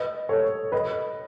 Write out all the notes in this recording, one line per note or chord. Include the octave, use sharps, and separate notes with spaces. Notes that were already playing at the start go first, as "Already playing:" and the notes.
Already playing: B4 D#5
A4 C#5
B4 D#5